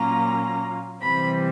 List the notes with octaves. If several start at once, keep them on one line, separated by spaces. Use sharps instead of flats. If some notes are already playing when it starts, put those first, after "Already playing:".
Already playing: A#2 F#3 A#3 C#4 F4 A#5
C3 E3 G3 C4 B5